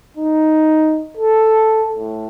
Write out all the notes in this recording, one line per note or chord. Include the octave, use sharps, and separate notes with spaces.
D#4
A4
A2